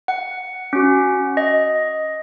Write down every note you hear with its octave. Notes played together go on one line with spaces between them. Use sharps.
F#5
C#4 F#4
D#5